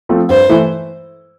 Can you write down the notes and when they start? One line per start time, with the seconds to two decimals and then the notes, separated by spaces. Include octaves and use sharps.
0.09 F3 A3 C4
0.29 G2 C5
0.49 E3 A3 E4